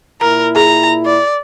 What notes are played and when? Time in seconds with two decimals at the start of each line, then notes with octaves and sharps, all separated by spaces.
0.21 A#2 E4 A#4 A#5
0.56 G#4 A#5
1.05 D5